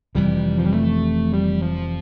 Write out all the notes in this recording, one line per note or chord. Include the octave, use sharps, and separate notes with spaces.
F1 F2 C3 E3 G3
F3
G3
A3
G3
F3